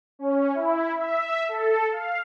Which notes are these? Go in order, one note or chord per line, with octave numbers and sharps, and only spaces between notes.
C#4
E4
E5
A4
F5